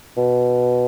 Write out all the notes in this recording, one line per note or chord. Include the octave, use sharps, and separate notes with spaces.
B2